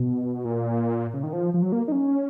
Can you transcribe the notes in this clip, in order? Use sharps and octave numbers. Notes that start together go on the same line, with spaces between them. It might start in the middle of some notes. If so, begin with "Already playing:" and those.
Already playing: B2
A#2
C#3
D#3
F3
F3
F#3
A#3
D#4
C#4